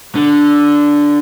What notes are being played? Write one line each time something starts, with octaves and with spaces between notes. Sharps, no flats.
D3